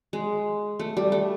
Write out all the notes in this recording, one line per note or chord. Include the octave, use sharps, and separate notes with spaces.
G#3
A3
G3
A3